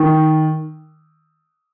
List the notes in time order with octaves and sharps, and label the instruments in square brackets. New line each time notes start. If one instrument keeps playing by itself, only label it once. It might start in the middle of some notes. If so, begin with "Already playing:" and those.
Already playing: [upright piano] D#3